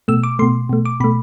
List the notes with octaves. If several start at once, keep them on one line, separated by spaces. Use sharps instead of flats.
B2 A3 E6
D6
B2 A3 C6
B2 A3
D6
B2 A3 B5